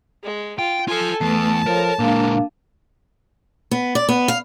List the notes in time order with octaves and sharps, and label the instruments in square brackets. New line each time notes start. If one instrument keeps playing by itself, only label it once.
[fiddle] G#3
[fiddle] F4 [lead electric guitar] G5
[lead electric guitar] F4 A5 [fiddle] A4 G#5
[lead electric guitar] E2 [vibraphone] A3 B4 [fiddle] A5
[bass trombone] F3 [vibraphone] A4 C#5 [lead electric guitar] A#4
[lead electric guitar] A#2 G#3 [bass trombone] A#3 [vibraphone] D4 F5
[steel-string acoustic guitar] B3
D5
B3
F5